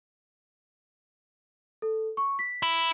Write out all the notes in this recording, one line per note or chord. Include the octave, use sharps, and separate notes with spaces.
A4
C#6
B6
E4